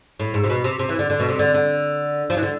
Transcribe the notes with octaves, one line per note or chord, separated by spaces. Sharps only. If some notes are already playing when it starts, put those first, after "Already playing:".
A2
G#2
C3
B2
C3
C3
E3
D3
D3
B2
C3
D3
D3
F3
E3
D3